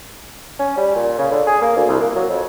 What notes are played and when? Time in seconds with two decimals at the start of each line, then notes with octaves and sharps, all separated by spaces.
0.59 C#4
0.77 G3
0.96 A#2
1.19 C#3
1.32 D3
1.47 G#4
1.61 A#3
1.76 D2
1.89 C2
2.01 A#3
2.16 F#3
2.30 F2